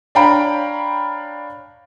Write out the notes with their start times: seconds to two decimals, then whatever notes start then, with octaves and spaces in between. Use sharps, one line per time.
0.15 D4 C#5 F5 G5 A#5 B5